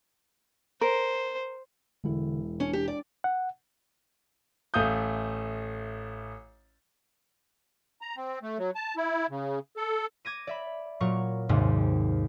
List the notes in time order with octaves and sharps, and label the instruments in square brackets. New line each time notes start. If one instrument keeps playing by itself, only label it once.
[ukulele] A#4 [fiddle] C5
[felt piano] E1 E4 [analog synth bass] D3
[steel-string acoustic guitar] C#4 [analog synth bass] D4
[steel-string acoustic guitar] G4
D5
[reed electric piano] F#5
[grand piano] A1 A3 F5 D#6 G6
[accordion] A#5
C4
A3
F#3
A5
E4
C#3
A4
[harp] D6 G#6 A#6 D#7
D5 E5 B5
A#2 F#3 A#4 C#6
G#1 D#2 G#2 C3